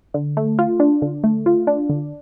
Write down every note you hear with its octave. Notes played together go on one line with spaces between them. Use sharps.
D3
A3
F4
D4
D3
A3
F4
D4
D3